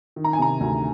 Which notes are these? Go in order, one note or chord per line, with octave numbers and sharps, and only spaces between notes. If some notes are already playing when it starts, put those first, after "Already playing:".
D#3
A#5
G#5
C3 A#5
D2